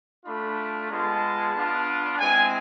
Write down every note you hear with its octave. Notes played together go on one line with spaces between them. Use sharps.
A3 D4 F4 B5
G#3 B3 F4 A5
B3 D4 F4
G#3 C4 E4 G#5